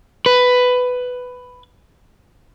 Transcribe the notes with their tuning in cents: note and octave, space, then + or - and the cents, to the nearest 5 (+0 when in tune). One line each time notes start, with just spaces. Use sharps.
B4 +10